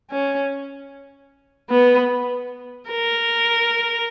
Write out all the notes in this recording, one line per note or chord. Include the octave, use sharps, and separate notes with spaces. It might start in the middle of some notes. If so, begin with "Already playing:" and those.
C#4
B3
A#4